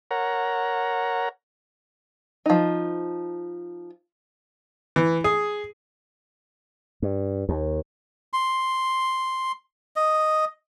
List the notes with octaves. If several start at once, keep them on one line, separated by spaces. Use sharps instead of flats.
A#4 C#5 F#5 A#5
F3 D#4
E3
G#4
G2
D#2
C6
D#5